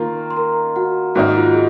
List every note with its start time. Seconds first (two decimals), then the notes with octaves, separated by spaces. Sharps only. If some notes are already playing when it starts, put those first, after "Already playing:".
Already playing: D#3 A#3 F4 A#4 A#5
0.31 C6
0.36 A#4 A#5
0.76 F#4 F#5
1.15 G#2 D#3 A#3 D#4 F#4 F#5
1.36 F4
1.45 F#4
1.54 G#4